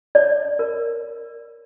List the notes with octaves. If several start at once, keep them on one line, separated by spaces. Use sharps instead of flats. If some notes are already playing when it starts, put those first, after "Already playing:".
C#5 D5
A#4